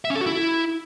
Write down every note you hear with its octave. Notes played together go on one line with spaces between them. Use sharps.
E5
C#4
A4
F#4
E4